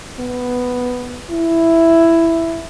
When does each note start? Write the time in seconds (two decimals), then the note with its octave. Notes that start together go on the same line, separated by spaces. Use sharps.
0.20 B3
1.30 E4